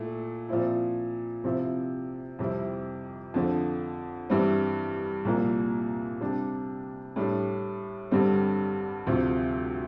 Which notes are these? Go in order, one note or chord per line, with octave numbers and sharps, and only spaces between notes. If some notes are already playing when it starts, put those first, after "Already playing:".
Already playing: A#2 A3 E4
A#2 F3 C4 E4
C3 F3 C4 E4
F2 C3 G3 C4 E4
F2 D3 F3
G2 E3 G3 C4 E4
C2 A#2 F3 A#3
C3 G3 D4
A2 G3 D4
G2 D3 G3 C4
D2 C3 F3